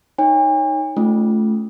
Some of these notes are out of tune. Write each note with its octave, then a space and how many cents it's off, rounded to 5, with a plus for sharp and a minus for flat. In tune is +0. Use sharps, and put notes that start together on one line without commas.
D#4 +0 C#5 +0 G#5 -45
A3 -20 C#4 +5 F4 +0